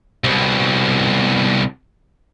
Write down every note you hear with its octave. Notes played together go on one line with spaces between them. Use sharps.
C2 B2